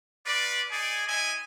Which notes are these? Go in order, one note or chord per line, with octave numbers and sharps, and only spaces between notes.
F4 B4 D5
D#4 G#4 D5 G#5
C4 E4 D#5 G#5